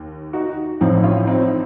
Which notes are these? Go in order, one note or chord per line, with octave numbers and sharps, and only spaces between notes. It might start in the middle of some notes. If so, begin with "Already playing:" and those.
Already playing: D#2
D#4 F#4
A1 A2 F3 C4 D#4
C#4 F4
C4 D#4